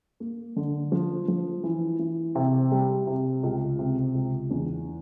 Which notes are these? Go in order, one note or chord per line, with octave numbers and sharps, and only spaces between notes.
A#3
D3
F3
F3
E3
E3
C3
G3
C3
C#2
C3
C#2
E2